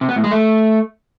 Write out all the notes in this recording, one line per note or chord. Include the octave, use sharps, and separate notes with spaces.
C3
B3
A2
G#3
A3